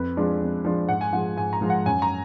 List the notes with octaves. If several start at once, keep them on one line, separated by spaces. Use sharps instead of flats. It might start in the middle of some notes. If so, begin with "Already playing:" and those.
Already playing: F2 B4
F3 G#3 D4
F2
F3 G#3 D4
G#2 F#5
G#5
F3 G#3 F#5
G#2 G#5
A#5
F3 G#3
F#5
F#2 G#5
A#5